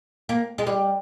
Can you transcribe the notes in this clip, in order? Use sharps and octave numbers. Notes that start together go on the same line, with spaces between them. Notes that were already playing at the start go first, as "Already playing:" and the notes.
A#3
G#3
G3